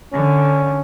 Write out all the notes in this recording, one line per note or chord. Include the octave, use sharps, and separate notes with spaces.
D3 C#4